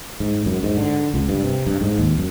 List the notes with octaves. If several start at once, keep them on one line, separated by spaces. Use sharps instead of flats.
G#2
F#2
G#2
D3
C#2
G2
C3
G2
G#2
D#2
F#2